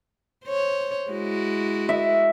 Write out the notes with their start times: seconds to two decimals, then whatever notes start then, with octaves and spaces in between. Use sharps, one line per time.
0.45 C5 C#5
1.11 G#3 E4 F#4
1.89 E5